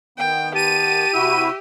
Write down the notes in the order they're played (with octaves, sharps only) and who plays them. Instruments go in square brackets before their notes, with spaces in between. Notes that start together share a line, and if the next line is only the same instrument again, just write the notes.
[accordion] D#3 B3 [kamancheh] G5
[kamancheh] G4 [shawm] A5 [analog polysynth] D#7
[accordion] C3 E4 F#4 [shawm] E5